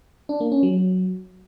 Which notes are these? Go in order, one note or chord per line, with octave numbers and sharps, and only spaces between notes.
D4
A#3
C#4
F#3